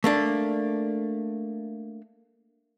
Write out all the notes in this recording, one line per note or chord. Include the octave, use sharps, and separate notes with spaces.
A3 A#3 D4